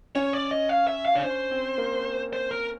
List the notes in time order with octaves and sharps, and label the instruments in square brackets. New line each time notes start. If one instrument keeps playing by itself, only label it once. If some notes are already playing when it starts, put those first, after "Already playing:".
[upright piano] C#4 [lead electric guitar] C#5
[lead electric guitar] D5
D#5
F5
E5
F5
[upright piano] D4 [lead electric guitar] C#5
[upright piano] C#4 [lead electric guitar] C5
[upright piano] C4
A#3
[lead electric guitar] C5
A#4